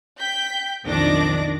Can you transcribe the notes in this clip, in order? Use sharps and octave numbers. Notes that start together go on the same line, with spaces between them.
G5 G6 B6
B1 F2 D#3 D4 D6 A#6